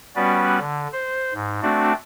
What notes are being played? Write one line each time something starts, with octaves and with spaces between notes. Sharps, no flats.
G3 B3 C#4 F#4 B4 D5
D3
C5
G#2
A3 C4 D4 F#4 D5